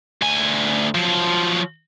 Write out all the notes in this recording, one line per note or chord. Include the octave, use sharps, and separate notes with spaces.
D2 G#5
F3 F#3